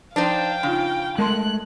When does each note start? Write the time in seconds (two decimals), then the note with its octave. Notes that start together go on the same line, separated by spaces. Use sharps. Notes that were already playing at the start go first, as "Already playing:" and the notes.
0.16 F3 D4 D#4 C5 F5 G5
0.63 C#3 D4 D#4 F4
1.18 G#3 A3 A#4 A5 C6 F#6